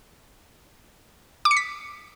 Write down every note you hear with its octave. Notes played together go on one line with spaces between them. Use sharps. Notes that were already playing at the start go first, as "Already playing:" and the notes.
D6
C#7
B6